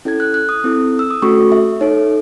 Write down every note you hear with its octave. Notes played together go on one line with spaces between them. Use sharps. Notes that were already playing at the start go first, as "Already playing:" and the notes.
C#4 E4 A4 G#6
F#6
F#6
D#6
C4 E4 A4
E6
D#6
A3 C#4 F#4 A4 C#6
E5
D#4 A4 C#5